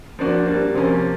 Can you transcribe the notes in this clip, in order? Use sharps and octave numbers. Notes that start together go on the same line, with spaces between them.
F3 A#3 D4 F#4
G3 A#3 D4
C3 F3 A#3 C#4